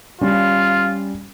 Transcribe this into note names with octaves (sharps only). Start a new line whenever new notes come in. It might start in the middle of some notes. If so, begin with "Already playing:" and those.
G3 C#4 F4